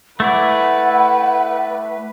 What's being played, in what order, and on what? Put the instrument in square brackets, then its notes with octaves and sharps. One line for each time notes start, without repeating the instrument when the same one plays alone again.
[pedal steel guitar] A3 E4 D5 [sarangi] B4 [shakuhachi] F#5